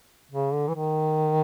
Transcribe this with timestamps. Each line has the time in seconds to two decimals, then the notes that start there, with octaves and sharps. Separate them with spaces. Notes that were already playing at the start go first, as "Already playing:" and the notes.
0.31 C#3
0.53 D3
0.69 E3
0.75 D#3